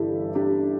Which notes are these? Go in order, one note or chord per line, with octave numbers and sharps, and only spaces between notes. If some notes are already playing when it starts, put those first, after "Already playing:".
Already playing: G1 G2 E3 E4 G4 A4
D4 G4